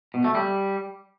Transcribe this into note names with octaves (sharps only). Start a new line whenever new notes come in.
B2
A3
G3